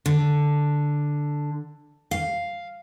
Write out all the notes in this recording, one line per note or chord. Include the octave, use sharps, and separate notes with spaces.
D3
F5